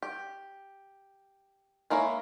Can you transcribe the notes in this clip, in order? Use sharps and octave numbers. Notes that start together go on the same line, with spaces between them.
G4
G#3 A#3 E4 A#4 C#5